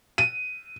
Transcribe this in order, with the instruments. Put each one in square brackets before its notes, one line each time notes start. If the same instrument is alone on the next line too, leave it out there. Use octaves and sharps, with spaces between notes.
[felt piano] D#7